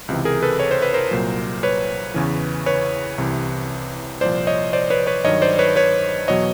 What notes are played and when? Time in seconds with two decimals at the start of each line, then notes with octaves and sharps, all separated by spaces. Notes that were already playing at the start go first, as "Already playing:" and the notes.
0.08 C#2 C3 E3
0.25 G#4 A#4
0.42 A4 B4
0.59 C#5
0.71 C5
0.82 B4
0.94 A#4 C5
1.11 C2 A#2 F#3
1.63 B4 C#5
2.14 E2 C#3 E3
2.66 B4 C#5
3.18 C2 C3 E3
4.21 C2 A#2 F3 C5 D5
4.47 C#5 D#5
4.73 C5 D5
4.90 B4 C#5
5.07 B4 C#5
5.25 G2 D#3 F#3 C#5 D#5
5.42 C5 D5
5.59 B4 C#5
5.76 B4 C#5
6.28 E2 B2 F#3 C#5 D#5